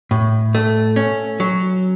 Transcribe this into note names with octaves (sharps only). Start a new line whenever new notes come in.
A2
A3
C#4
F#3